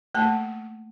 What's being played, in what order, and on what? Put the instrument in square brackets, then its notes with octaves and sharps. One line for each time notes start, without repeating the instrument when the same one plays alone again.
[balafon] A3 A#3 A5